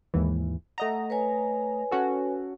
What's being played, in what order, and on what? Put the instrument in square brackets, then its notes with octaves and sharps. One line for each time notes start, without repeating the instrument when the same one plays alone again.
[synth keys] D#2 G#2 E3
[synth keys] A3 D#5 A#5 [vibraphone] F#5
[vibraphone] B4 C#5 G#5
[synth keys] C#4 F#4 A4